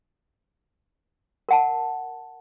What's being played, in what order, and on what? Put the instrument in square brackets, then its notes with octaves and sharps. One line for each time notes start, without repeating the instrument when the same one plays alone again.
[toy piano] A#4 F#5 A5